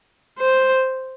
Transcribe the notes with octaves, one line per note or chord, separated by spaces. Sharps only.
C5